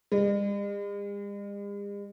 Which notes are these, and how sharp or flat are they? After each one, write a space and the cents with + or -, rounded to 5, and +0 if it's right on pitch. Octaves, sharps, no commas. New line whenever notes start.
G#3 -45